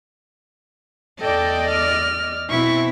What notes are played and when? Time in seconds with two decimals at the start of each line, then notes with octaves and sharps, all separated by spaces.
1.21 E2 A4 D5 D#5 G5
1.71 F6
2.50 B2 C4 E4 C#6